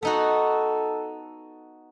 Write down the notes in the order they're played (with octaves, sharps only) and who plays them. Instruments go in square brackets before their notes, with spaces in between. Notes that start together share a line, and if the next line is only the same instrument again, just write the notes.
[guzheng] B3 D#4 F#4 [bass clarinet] A4